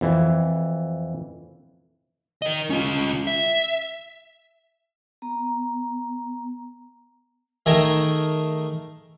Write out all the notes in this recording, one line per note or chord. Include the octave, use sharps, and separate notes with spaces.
F2 E3
A#4 D#5
C#4 F4
E5
B3 A#5
D#3 A3 G#4 A#4